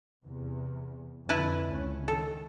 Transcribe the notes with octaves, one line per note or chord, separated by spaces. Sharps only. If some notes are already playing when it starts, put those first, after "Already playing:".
E2 C3
F2 D3 E4 B4 A5
C#2 C#4
D#3 A4